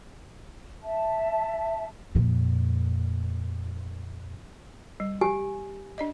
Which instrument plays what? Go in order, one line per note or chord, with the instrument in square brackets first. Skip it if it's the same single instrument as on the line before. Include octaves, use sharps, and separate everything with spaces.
[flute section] E5 A5
[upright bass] F2 A#2
[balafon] G3
[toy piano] G4 G#5
[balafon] D4 D5 D#5